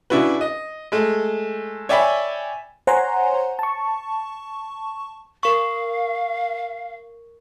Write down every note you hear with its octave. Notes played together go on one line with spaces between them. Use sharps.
C#3 D4 E4 F#4 B4
D#5
G#3 A3
C#5 D5 E5 G5 G#5 B5
C5 C#5 F#5 G#5 A#5 C6
A5 C#6
A#4 F5 C#6